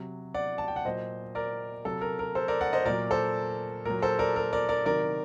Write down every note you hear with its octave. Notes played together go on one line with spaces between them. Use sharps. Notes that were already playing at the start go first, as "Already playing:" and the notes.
Already playing: C3 F#3
D5 F#5
A5
G5
F#5
A#2 F#3 C5 D#5
A#4 D5
C3 F#3 A4
A#4
A#4
A4 C5
A#4 D5
D5 F#5
C5 D#5
A#2 F#3 A#4 D5
A4 C5
A#2 F#3 A#4
A4 C5
A#4 D5
A#4
A#4 D5
A#4 D5
C3 D#3 F#3 A#4 D5